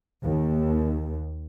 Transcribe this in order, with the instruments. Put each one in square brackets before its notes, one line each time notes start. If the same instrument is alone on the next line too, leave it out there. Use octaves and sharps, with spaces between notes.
[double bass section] D#2